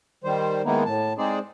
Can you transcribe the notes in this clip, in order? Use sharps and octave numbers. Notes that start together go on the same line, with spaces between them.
D#3 G3 C5
D#3 G#3 A#3 B3 D#4 E4
A2 A5
G#3 C4 D#4 G#4 C5 D5